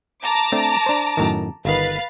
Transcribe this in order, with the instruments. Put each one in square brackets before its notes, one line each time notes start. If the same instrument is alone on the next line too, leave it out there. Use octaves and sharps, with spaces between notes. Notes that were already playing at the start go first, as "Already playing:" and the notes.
[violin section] A5 A#5 D6
[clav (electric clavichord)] A3 C4 D4
D4 C5
F#2 A2 D#3
[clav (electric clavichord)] G1 D#3 [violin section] B4 F5 A6